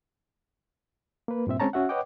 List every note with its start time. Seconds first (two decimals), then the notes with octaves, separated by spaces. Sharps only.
1.28 A#3 B4
1.47 G2 A#2 C4 E5
1.60 G#3 C4 C#4 C#5 A5 A#5
1.73 C#4 F#4 E5 F#5
1.89 B4 C#5 D#5 F#5 G5 D6